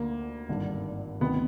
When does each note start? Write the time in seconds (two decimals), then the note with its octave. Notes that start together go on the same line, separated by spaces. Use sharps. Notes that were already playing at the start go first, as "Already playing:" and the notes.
Already playing: D2 D3 A#3
0.49 G#1 G2 D3
1.21 D2 C3 D#3 B3